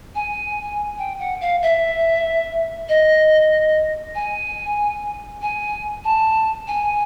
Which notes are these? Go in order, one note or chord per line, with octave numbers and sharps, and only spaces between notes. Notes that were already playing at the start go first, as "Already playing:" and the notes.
G#5
G5
F#5
F5
E5
D#5
G#5
G#5
A5
G#5